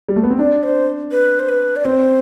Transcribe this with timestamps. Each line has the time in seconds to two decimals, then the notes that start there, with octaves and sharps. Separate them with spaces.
0.08 G3
0.16 A3
0.23 B3
0.30 C4
0.39 D4 D5
0.63 C5
1.11 B4
1.40 C5
1.49 B4
1.76 D5
1.85 C4 C5